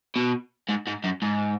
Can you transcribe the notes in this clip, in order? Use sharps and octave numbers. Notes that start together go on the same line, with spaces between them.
B2
G#2
G#2
F#2
G#2